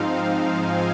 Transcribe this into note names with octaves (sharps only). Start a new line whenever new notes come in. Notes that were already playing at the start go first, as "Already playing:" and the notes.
Already playing: G#2 F3 C4 D#4 F5
G#5